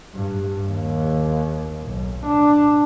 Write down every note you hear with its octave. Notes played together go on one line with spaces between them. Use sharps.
G2
D#2
B1
D4